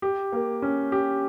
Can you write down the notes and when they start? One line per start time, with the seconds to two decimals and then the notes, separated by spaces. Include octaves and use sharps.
0.02 G4
0.32 A#3
0.62 C#4
0.92 G4